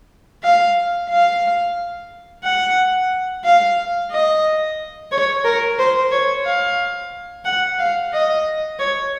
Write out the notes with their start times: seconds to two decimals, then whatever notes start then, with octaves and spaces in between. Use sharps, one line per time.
0.43 F5
1.10 F5
2.44 F#5
3.44 F5
4.11 D#5
5.12 C#5
5.45 A#4
5.79 C5
6.11 C#5
6.45 F5
7.45 F#5
7.79 F5
8.13 D#5
8.79 C#5